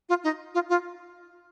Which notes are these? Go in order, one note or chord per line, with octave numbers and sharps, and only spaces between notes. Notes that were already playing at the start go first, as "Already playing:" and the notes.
F4
D#4
F4
F4